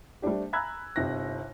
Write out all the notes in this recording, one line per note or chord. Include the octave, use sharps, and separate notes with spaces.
G3 A3 C4 D4 G4
G#5 A#5 B5 E6 F#6 G#6
G1 C3 D#4 G5 F#6 A#6